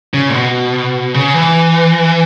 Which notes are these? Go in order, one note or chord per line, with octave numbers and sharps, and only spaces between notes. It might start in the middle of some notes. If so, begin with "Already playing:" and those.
C#3
A#2
B2
C#3
E3